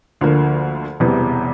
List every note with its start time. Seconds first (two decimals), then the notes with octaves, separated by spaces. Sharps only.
0.21 D2 D3 F3 A#3
1.00 E1 E2 C3 E3 G3